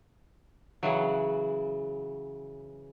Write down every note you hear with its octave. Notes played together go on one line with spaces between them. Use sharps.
C#3 E3 F#3